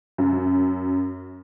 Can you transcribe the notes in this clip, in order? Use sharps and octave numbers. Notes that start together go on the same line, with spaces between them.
F#2